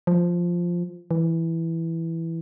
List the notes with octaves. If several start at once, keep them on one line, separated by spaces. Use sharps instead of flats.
F3
E3